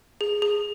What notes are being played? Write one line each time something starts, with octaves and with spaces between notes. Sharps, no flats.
G#4
G#4